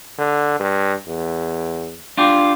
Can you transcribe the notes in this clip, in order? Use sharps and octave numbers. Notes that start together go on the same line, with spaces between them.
D3
G2
E2
D4 F4 G4